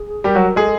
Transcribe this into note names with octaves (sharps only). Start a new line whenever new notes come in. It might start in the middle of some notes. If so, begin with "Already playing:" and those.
Already playing: G#4
G3 G4 A#4
F#3 F#4
G#3 G#4 A4